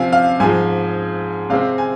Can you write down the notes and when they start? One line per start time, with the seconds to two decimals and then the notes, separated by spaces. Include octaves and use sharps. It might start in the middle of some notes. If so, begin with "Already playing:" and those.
Already playing: C3 F3 C4 F5 G#5
0.12 F5
0.40 G#2 F3 G#3 G#5
1.50 C3 G#3 C4 F5
1.78 G#5